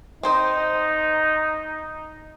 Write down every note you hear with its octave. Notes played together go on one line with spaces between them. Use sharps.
C4 D#4 C5 D#5